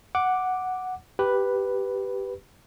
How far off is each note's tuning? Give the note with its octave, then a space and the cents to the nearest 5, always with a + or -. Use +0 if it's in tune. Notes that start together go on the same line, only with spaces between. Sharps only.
F#5 +0 D6 +0
G4 -5 B4 +0